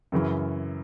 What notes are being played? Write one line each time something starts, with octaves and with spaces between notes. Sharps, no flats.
F#2 C#3 E3